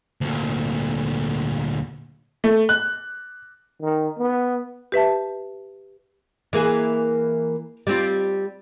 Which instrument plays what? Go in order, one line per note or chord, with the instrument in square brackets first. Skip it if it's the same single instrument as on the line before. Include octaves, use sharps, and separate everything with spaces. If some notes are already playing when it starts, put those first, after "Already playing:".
[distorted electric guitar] D2 A#2
[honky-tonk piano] A3
F#6
[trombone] D#3
B3
[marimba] G4 B4 E5 A5
[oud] E3 A#3 G#4
G3 C4 F4